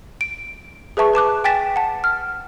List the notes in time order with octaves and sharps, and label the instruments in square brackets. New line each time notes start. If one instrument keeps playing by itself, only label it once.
[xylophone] D7
G#4 B4 E5 A5 C#6
B4 A5 D6 F#6
G5 G#5 A6 B6 E7
F#5 A5
F6